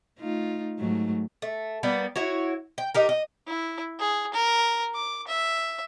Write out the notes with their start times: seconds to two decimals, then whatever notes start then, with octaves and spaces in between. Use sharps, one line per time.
0.19 A3 D#4 F4
0.79 G#2 F#3 A3
1.42 A3
1.83 G3 A#3 B3
2.16 E4 F#4 C#5
2.78 G5
2.94 D#4 G4 A#4
3.09 D#5
3.48 E4
4.00 G#4
4.34 A#4
4.95 D6
5.28 E5